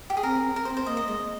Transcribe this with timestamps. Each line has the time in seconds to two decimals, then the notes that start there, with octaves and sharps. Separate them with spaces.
0.10 G4
0.17 G#4
0.23 C4 A#4
0.44 C4
0.56 A#4
0.65 C4 C5
0.77 C5
0.86 A#3 D#5
0.97 D#5
1.07 G#3 D#5